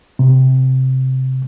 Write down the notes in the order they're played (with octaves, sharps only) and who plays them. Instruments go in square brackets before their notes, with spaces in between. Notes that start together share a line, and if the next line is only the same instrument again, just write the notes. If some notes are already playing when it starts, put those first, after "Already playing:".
[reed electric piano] C3